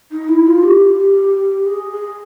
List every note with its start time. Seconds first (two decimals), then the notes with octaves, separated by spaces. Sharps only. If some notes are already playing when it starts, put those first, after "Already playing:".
0.11 D#4
0.28 E4
0.46 F4
0.63 G4
1.66 G#4
1.91 G#4